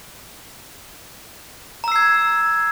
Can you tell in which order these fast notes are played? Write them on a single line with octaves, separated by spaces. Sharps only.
A#5 E6 C7 G#6